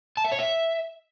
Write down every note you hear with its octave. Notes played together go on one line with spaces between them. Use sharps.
A5
E5
C#5
E5